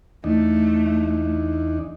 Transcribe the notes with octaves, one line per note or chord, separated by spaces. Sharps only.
E2 A3 D4 D#4